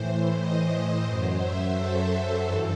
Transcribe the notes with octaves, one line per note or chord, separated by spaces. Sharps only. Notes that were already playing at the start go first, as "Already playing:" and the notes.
Already playing: A2 E3 C5
D#5
F#2 F#3 C5
E5
A4
G2 E3